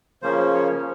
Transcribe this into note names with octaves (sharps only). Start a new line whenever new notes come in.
C#3 F3 A#3 C#4 C5
C#5